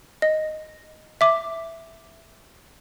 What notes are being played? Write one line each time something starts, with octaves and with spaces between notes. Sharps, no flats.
D#5
E5 D6